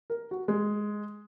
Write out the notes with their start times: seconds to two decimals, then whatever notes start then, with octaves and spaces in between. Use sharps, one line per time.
0.10 A#4
0.31 F#4
0.48 G#3